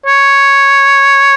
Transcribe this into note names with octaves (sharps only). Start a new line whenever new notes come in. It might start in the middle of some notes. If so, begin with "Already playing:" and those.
C#5